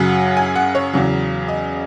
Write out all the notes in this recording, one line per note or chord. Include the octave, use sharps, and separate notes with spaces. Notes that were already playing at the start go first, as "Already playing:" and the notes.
Already playing: F#2 C#3 F#3 F#5
G#5
F#5
C#5
E2 C#3 F#3
D#5